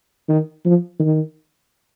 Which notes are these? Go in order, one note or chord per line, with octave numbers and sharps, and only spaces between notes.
D#3
F3
D#3